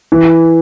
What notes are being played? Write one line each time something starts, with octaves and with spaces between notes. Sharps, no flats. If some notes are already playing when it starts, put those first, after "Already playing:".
E3